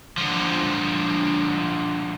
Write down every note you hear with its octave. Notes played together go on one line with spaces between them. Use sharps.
D3 F3